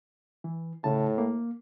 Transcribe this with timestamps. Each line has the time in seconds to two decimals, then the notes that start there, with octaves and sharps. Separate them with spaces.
0.44 E3
0.84 A2 C#3 A5
1.18 A#3